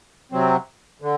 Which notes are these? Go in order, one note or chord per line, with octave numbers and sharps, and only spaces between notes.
C3 F#3 C4
D3